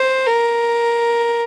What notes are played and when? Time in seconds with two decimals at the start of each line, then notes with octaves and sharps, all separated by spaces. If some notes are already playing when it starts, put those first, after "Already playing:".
Already playing: C5
0.27 A#4